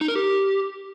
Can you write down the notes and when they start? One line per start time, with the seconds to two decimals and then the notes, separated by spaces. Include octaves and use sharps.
0.01 D#4
0.08 A#4
0.15 G4